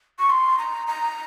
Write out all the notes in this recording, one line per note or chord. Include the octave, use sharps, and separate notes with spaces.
C#6
C6
A#5
A#5